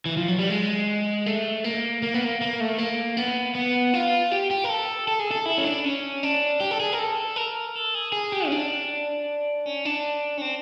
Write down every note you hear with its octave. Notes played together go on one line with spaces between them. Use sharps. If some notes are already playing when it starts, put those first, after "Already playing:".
E3
F3
F#3
G3
G#3
A3
A#3
A#3
B3
A#3
A#3
A3
A#3
B3
B3
F4
G4
G4
A#4
A4
A4
G#4
A4
E4
C#4
D4
C#4
D4
G4
A4
G#4
A#4
A4
A#4
A4
G#4
G#4
G4
C#4
D4
C#4
D4
C#4
C4